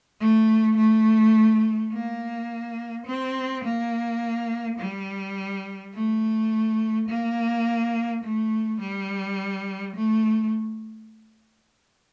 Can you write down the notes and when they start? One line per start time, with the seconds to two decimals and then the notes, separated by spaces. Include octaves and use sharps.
0.20 A3
0.77 A3
1.92 A#3
3.06 C4
3.64 A#3
4.79 G3
5.94 A3
7.09 A#3
8.23 A3
8.81 G3
9.95 A3